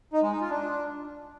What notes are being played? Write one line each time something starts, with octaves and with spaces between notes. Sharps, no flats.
D#4
G#3
D#4
F4
D4